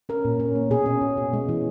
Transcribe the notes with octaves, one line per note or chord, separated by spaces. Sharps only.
C#4 A#4
A#2
C#4
A#3
B2 G#4
C#4
B2
B2
G#3
E3